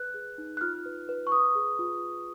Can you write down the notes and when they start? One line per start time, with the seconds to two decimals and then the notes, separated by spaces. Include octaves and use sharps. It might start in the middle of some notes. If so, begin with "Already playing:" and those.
Already playing: B4 F#6
0.14 G#4
0.38 D#4
0.57 F#6
0.61 F4 F6
0.85 B4
1.09 B4
1.27 C#6
1.32 B4 D#6
1.55 G#4
1.79 F4